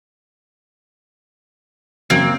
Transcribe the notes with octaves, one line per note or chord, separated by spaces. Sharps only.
F#2 C#3 A#3 C4 F#4